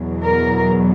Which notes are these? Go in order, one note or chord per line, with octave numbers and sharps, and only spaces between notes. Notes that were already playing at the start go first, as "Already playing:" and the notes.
Already playing: E2 B2 F#3
A#4